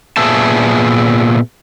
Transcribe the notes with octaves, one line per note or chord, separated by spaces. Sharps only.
A#2 B3 G#4 E5 A5